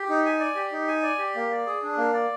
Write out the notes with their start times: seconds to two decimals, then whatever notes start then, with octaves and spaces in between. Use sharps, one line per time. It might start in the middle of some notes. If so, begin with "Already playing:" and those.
Already playing: G4
0.09 D#4
0.25 G#5
0.40 D5
0.56 G4
0.72 D#4
0.88 G#5
1.03 D5
1.19 G4
1.36 A#3
1.51 D5
1.66 G#4
1.83 D4
1.98 A#3
2.14 D5